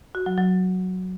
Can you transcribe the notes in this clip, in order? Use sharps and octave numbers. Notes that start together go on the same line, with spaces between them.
F#4
F#3
F#3